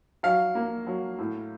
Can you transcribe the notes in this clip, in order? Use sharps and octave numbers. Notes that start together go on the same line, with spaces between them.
F#3 F5
A#3
F#3
A2